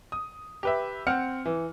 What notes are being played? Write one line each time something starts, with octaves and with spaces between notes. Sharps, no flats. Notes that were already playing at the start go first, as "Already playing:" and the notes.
D#6
G4 B4 E5
C4 F#5 F6 C#7
E3